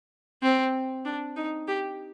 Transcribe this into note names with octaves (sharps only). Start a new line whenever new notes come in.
C4
D4
D#4
G4